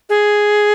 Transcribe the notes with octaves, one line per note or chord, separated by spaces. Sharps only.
G#4